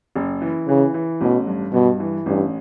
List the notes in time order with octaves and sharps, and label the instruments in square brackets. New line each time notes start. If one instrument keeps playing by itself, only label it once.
[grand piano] F#1
E3
[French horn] C#3 [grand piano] E3
[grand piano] E3
[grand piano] A1 [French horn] B2
[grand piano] G2
[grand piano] G2 [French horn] B2
[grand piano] E3
[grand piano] A1 [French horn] G2